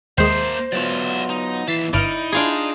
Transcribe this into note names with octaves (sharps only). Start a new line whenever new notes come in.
D#2 G#3 A#3 C5 E5 C7
F#3 B3 F4 D5 E5
D#4
D#2 E3 E5 A6 B6 C7
G1 D#4 E4 D5 F6 C#7
D4 F4 G#4